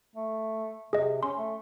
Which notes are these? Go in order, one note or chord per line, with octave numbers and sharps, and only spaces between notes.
A3
C3 G#4 D#5
C#4 C6
A3